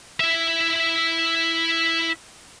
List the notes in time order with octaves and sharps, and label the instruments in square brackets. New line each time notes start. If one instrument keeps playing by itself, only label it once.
[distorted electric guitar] E4 E5